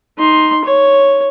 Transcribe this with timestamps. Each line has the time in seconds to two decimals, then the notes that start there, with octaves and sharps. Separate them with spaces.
0.18 D#4 C6
0.65 C#5